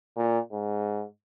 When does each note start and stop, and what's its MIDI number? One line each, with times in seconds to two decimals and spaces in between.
0.16 0.39 46
0.52 1.05 44